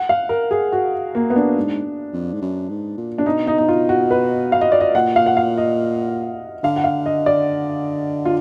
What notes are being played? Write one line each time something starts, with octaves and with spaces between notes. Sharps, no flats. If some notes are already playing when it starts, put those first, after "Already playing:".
Already playing: F#5
F5
A#4
G#4
F#4
A#3
B3
D4
G#2
F2
G#2
F#2
G#2
A#2
D4
B2 D#4
D#4
D#4
F4
F#4
B4
F5
D#5
D5
D#5
A#2 F#5
F5
F#5
F5
D#5
D3 F5
F#5
F5
D#5
D5
F4